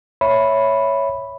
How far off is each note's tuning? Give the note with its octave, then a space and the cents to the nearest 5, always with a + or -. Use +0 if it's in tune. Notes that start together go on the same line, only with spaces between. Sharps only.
C#5 +0 E5 +0 B5 +0